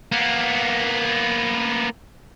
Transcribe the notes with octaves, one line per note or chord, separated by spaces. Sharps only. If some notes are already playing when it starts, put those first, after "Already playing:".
A#3 B3